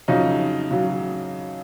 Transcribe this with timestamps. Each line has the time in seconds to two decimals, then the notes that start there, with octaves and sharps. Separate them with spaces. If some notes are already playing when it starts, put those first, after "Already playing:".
0.08 F2 C#3 F#3 D#4
0.71 C#3 F#3